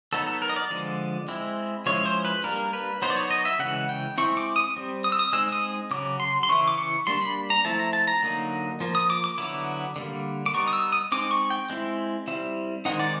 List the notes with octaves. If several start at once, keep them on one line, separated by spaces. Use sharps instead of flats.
F#3 B3 D#4 A4
A4
A#4
D#5
D5
D3 F3 G#3
G#3 C4 E4
F3 G#3 C#4 E4 C#5
C5
B4
G3 A#3 D4 A#4
B4
F#3 B3 D#4 C5
D5
C#5
D#5
E5
C#3 E3 G#3 F#5
G5
G#3 C4 E4 C#6
D6
D#6
G3 C4
D#6
E6
D#6
G#3 C4 D#4 E6
D#6
C#3 F#3 D6
C6
C6
C#3 E3 E4 C#6
D6
C#6
G3 A#3 D4 C6
B5
A#5
F3 A3 C4 E4 A5
A#5
A5
A#5
D3 F#3 A#3 D#4
F3 A#3
D#6
D6
D6
D3 F#3 B3 E4 D6
D3 G3 A#3
D6
G3 B3 D#4 C#6
D#6
E6
D#6
G#3 C4 D#4 D6
C#6
G5
G#3 C4 E4
G3 C4 E4
D#3 G#3 C4 D#4 F#5
D5